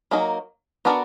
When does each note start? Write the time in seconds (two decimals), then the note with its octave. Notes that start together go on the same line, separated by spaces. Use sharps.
0.11 F#3 A#3 D#4 A#4
0.85 B3 D4 F#4 A#4 D5